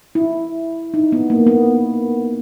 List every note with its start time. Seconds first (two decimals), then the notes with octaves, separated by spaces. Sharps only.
0.15 E4
0.94 D#4
1.12 B3
1.30 A#3
1.47 B3